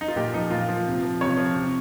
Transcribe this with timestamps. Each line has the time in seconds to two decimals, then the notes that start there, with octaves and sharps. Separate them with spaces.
0.01 D#4
0.08 F4
0.16 A#2 G4
0.33 F3 D#4
0.51 A#2 F4
0.69 F3
0.86 C3
1.03 F3
1.21 C3 C#5
1.37 F3
1.55 C3